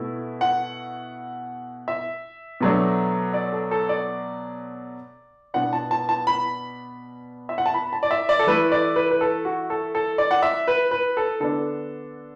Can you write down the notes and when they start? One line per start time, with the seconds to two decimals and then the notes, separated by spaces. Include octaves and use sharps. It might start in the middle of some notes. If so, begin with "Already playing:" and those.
Already playing: B2 A3 E4
0.41 F#5
1.88 E5
2.61 B2 F#3 A3 D4
3.34 D5
3.53 A4
3.71 A4
3.89 D5
5.54 B2 B3 D4 F#5
5.73 A5
5.91 A5
6.09 A5
6.27 B5
7.49 E5
7.58 F#5
7.66 A5
7.74 B5
7.93 A5
8.03 D5
8.11 E5
8.29 D5
8.39 A4
8.47 E3 A3 E4 B4
8.72 D5
8.96 B4
9.11 B4
9.21 A4
9.45 F#4
9.70 A4
9.95 A4
10.18 D5
10.31 F#5
10.42 E5
10.68 B4
10.91 B4
11.17 A4
11.40 D3 B3 D4 A4